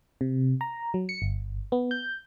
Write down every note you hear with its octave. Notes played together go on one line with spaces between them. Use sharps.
C3
A#5
F#3
C#7
G1
B3
G6